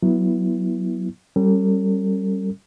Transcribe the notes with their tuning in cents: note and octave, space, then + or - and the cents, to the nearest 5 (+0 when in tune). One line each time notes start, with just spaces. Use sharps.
F#3 +0 B3 -15 E4 +0
G3 -15 C#4 -25 A4 +45